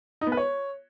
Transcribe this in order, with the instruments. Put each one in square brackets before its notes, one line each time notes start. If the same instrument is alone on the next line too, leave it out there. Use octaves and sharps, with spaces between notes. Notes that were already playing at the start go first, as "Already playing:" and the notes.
[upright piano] D#4
B3
B4
C#5